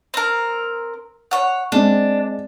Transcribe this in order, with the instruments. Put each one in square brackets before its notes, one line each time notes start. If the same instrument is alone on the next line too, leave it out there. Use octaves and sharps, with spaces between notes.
[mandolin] C4 A#4
C#5 F#5
[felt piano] G#3 C4 [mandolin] D4